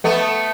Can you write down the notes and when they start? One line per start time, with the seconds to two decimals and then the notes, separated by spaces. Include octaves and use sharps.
0.04 A3 B3